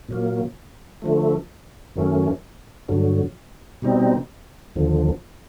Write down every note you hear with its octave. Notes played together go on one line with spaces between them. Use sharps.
A#2 F#3 A#3
D3 F3 A3
F#2 D#3 F#3 A3 C#4
G2 D3 F#3
B2 G3 C4 D#4
D#2 D3 F3